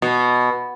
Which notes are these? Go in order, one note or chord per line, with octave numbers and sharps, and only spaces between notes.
B2